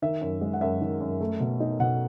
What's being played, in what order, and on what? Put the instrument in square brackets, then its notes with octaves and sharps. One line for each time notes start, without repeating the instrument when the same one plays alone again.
[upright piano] D#3 E5
F#2
G#3
F#5
F#2 E5
D#3
F#2
A3
B2
D#4
B2 F#5